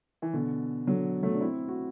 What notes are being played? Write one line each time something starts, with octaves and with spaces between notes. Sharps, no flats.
E3
B2 D3
D3 F#3
F#3 A3
D4
C4 E4
F#4